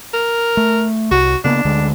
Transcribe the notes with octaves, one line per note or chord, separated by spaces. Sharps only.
A#4
A3
C2 F#4
C#3 A#3 B3 D4
D2 D3 G#3